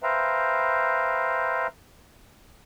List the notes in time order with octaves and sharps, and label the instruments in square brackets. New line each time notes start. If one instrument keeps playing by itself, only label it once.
[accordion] B4 C5 E5 F5 G5 A#5